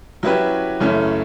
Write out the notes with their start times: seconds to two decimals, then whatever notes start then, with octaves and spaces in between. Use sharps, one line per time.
0.23 F#3 C#4 E4 G4 B4
0.80 F#2 C#3 E3 A3 C#4